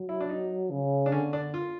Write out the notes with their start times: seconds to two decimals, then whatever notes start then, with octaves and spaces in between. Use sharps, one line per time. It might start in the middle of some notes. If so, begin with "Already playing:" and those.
Already playing: F#3
0.09 E4
0.20 D4
0.29 D#4
0.71 C#3
1.06 D4
1.12 D3 C#4
1.33 D4
1.54 F4